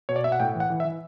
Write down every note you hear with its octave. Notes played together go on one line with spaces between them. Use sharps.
B2 C#5
D5
B2 E5
F#5
A2 G5
E3
F#5
E3
E5
E3